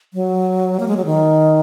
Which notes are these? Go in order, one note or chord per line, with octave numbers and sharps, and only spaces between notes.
F#3
A#3
G#3
F#3
D#3